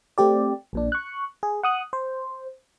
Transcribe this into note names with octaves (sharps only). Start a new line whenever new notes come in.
A3 C4 G4 D5
A#1 A#2 D4
C#6 F#6
G#4
F#5 D#6 F#6
C5